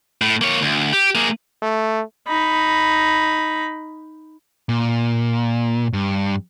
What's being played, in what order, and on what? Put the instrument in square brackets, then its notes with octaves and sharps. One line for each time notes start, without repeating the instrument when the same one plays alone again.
[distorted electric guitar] A2
A#3 C#5
D2
G4
A#3 G#4
[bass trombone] A3
[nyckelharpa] D#4 B5
[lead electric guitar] A#2
G2